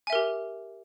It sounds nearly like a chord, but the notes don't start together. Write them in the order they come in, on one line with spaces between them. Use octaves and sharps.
G#5 E5 A#4 G4